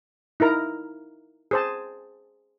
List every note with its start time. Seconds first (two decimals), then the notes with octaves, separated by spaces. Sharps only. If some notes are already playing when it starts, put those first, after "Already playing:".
0.40 D#4 E4 A#4 A#5
1.51 G#4 C5 A5